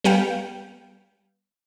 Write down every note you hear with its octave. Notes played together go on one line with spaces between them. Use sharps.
G3 B3 F5 G5